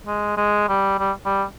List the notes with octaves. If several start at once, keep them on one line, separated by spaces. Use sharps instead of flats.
G#3
G#3
G3
G3
G3